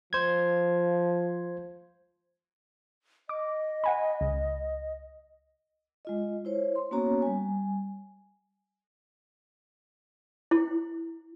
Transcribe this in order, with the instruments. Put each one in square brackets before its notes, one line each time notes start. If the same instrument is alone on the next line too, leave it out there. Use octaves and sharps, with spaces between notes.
[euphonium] F3 [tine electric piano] C5 G#6
[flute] D#5 [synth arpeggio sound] D6
[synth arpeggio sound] F#5 G#5 B5
C#2
[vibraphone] G#3 F4 D#5
E4 C5 C#5
C6
A#3 B3 C#4 F#4 C#5 A#5
G3 G#5
[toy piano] E4